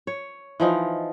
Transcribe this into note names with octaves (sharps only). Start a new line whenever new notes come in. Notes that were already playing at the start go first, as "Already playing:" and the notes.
C#5
E3 F3 D#4 F4